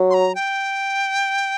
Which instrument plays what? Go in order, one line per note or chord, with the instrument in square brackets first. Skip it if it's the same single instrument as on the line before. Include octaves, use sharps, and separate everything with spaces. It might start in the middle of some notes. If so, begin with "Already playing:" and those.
Already playing: [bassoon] F#3
[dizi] C6
A#5
G5